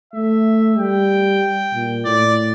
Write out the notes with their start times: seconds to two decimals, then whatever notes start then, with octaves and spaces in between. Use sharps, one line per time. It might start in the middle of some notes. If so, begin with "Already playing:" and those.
0.13 A3 E5
0.78 G3 G5
1.74 A#2
2.05 A2 D5